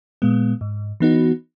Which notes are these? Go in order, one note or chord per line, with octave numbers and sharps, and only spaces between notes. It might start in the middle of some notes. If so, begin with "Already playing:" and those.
A#2 G#3 B3
G#2
E3 B3 D#4 F#4